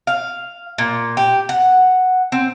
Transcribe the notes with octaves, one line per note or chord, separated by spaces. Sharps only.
F5
A#2
G4
F#5
C4